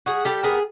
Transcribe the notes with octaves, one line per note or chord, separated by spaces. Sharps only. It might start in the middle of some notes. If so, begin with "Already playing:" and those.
G3 F#4 G#4
G3 G4 A4
B3 G#4 A#4